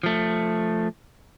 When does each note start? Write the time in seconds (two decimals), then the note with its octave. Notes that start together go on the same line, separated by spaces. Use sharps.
0.03 F3 A3